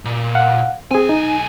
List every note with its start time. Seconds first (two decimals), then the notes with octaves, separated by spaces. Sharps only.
0.05 A#2
0.35 F5 F#5
0.91 B1 C4 G#4 G#5
1.09 D#4